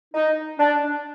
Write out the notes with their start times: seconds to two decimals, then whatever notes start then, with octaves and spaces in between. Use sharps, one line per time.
0.14 D#4
0.60 D4